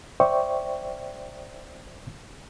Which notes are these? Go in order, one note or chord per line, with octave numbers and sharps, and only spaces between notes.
C5 D5 E5 G5 C#6